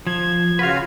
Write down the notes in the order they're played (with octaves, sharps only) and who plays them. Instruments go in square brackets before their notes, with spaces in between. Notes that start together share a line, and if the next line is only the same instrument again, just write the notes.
[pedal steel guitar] F3 [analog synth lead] G#6
[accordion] C#3 F4 F#4 [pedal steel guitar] B4 F5